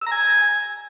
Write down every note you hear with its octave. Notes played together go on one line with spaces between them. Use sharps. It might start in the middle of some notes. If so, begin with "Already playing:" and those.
E6
A#5
G#5